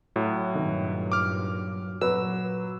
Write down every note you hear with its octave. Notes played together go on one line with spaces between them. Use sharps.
A2 F#3
G2 A#2 D#3
D6 F6
A#2 F#3 B4 E6